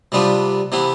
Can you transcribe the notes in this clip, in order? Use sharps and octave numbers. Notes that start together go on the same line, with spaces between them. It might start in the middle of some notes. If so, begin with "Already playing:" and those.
C3 G3 B3 D4 F4
C3 E3 B3